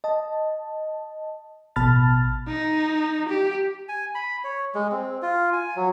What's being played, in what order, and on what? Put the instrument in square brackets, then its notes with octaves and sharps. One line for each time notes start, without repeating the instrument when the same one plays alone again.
[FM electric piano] D#5 A5
A1 B2 A5 B5 F6 A6
[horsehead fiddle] D#4
G4
[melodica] G#5
B5
C#5
G#3
C4
F4
G#5
F#3